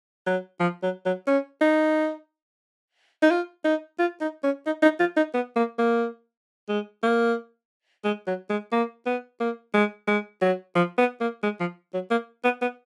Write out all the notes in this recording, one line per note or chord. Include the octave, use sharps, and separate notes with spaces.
F#3
F3
F#3
F#3
C#4
D#4
D#4
F4
D#4
F4
D#4
C#4
D#4
D#4
F4
D#4
B3
A#3
A#3
G#3
A#3
G#3
F#3
G#3
A#3
B3
A#3
G#3
G#3
F#3
F3
B3
A#3
G#3
F3
F#3
A#3
B3
B3